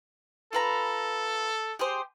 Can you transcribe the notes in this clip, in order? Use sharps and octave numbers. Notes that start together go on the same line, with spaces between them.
F4 A4 B4 A#5
G4 G#4 C5